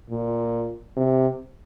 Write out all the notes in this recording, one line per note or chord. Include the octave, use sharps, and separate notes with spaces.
A#2
C3